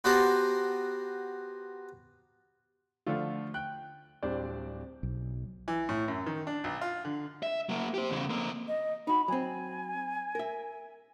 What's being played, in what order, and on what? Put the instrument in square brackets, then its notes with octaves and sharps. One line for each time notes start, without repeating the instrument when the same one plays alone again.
[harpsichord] B3 F#4 G4 A#4 C5 A5
[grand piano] D3 F3 A3 F4
G5 F#6
D1 G3 C4 D4 D5
[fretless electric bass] B1
[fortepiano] E3
A2
F#2
D#3
D4
B1
F4
D3
[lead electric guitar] E5
F#3 A#3
G4 C5
E2 C#3
A#3 C4
[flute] D#5
[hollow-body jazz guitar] D#4 F#4 [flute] B5
[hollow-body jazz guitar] F#3 C4 [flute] G#5
[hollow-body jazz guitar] A#4 E5